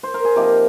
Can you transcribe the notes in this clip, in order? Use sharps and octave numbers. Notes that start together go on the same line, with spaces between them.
C5
A#4
G#4
C3 F3 A#3 D#4 G4